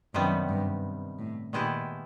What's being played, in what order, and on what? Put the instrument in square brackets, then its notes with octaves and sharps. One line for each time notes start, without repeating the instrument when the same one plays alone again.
[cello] F#2 [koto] C3 D#3 G3 B3
[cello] G2
A2
[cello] A#2 [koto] D#3 G#3 B3 E4 G4